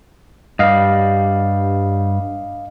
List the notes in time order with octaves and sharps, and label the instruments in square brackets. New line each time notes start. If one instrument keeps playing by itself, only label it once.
[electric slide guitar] G2 G3 [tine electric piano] D#5 F5